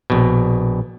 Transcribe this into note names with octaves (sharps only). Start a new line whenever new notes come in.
A#1 B2